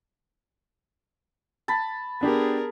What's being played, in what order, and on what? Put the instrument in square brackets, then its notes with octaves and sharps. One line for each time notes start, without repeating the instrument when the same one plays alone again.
[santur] A5 B5
[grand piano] B3 D4 G4 [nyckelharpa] G#4 A#4